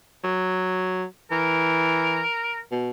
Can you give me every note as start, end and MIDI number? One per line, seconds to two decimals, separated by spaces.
0.24 1.04 54
1.31 2.21 52
1.31 2.61 70
2.72 2.91 47